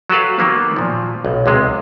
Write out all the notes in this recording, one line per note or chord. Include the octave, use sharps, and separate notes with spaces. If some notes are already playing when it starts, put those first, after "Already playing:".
F#3 F#4 G4 A4 B4 F5
D#3 F#3 A#3 B3
A#2 F3
B1
C#2 C3 G#3